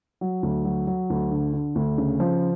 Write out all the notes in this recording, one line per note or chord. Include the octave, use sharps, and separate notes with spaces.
F#3
D2
F#3
F#3
D2
D3
D3
D2
C#3
F3